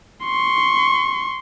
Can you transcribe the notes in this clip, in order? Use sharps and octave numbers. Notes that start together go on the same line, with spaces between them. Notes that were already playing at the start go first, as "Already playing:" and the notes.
C6 C#6